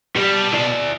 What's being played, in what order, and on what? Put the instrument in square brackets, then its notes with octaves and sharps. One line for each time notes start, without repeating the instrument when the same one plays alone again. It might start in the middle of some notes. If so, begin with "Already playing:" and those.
[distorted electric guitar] B2 A5 [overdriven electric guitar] G3
[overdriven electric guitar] E4 D5